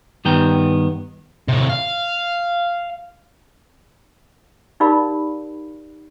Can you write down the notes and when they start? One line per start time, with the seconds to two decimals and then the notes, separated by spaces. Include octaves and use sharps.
0.25 G2 D#3 B3 G5 A#5
1.49 A2 C3
1.70 F5
4.80 D#4 G4 A#4 D5 F5 B5